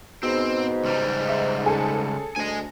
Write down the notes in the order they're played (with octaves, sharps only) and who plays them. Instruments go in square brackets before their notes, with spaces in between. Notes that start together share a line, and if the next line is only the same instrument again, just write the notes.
[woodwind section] G#2 [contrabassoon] B2 [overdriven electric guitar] C4
[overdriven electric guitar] C#2 G3
[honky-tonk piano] E5
[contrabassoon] C#3 [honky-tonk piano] G#4 A4
[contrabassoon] D2 [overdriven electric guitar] D#5 G#5